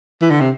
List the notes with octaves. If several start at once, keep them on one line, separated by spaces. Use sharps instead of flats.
E3
D3
C3